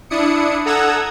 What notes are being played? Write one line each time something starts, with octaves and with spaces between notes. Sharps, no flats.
D4 E4 D#6 C#7
A4 F#5 A#5 D#6 E6 G#6